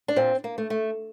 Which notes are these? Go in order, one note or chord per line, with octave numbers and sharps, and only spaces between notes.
D4
A#2 C4
A#3
A3
A3